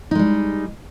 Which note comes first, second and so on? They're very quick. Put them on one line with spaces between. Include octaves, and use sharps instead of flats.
D#4 G#3 G3